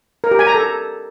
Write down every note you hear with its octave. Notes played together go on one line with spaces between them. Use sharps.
A#4
G4
G#5
A#5
A4